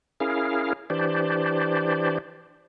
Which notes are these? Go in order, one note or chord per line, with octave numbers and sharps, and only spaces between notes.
C#4 E4 G#4 A#4 F5
E3 D4 G4 C5 D5